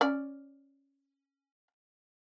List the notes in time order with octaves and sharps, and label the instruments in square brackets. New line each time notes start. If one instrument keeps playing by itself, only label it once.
[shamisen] C#4 D5